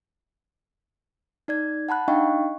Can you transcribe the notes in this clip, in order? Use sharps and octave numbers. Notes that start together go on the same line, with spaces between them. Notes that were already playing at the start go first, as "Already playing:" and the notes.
D#4 D5 G#6
F#5 A5 B5 F#6
D4 D#4 D#5 F5 G5 C#6